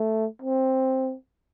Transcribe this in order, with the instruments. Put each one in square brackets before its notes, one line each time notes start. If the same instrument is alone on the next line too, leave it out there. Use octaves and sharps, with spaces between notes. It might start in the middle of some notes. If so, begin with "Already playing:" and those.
Already playing: [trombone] A3
C4